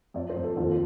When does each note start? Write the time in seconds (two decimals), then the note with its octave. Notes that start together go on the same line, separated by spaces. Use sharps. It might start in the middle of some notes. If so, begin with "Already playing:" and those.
0.14 F2 D5
0.29 C5
0.36 F2
0.44 A4
0.57 D#2 F4